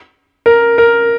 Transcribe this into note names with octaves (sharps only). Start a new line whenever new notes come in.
A#4
A#4